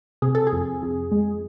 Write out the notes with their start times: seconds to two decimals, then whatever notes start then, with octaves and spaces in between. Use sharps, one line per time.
0.22 C3 G#4
0.35 A4
0.47 G#4
0.52 F2
0.82 F2
1.11 G#3